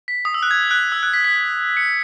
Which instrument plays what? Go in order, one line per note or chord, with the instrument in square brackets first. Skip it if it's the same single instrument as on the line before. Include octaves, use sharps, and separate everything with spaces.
[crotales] B6
D#6
E6
F#6
G#6
F#6
E6
F#6
B6
B6
C#7